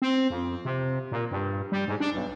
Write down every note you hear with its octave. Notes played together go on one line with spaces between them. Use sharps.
C4
F2
C3
A#2
G2
G3
G#2
D4
B1